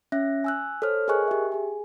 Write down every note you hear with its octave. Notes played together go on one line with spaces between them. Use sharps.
C#4 E5 F#6 A#6
G#5 E6 F#6
A4 C5 C#5 F6
G#4 A#4 D#5 G#5 C#6 F#6
G4 E5
G#4 G#5